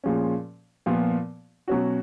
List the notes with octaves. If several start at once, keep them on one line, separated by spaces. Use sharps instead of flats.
A#2 F3 G#3 C#4
A#2 F3 B3
B2 F#3 C#4 F#4